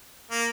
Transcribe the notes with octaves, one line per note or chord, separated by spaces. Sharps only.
A#3